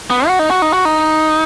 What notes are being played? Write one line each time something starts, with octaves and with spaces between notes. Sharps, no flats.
B3
F#4
D#4
F#4
D#4
F#4
D#4